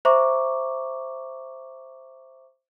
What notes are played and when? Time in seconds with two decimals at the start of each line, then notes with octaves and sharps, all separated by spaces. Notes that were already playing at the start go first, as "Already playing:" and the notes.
0.05 C5 E5 A#5 C#6 D6